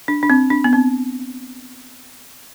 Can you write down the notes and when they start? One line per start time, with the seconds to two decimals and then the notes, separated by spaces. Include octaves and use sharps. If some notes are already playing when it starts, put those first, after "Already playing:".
0.08 D4
0.23 D4
0.30 C4
0.50 D4
0.64 B3
0.73 C4